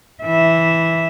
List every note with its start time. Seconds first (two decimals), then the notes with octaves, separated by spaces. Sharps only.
0.23 E3 E5